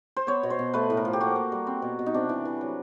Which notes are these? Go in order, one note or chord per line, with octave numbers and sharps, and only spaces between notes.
C5
B3 C#5
B2
C5
B2
A3 B4
A2
A#4
F3
G4
A#3 F#4
A#3
G3
C4
B2
B2
D#4
C3 D4
E3
E3
F#3